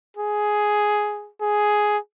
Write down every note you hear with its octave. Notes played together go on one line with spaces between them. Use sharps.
G#4
G#4